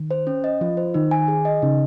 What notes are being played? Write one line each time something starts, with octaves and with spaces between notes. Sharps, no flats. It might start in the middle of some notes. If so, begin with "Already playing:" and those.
Already playing: D#3
C5
C#4
D#5
F3 F4
C5
D#3 D#4
G#5
G#4
D#5
C#3 D#4